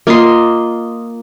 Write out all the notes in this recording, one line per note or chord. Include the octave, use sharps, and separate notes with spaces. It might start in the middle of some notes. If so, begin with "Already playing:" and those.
A#3 F4 D#5 C6